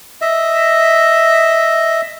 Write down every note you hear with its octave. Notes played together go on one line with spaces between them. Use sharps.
D#5 E5